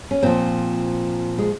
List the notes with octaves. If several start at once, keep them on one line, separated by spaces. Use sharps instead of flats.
C#4
A#2 F3 C4
G#3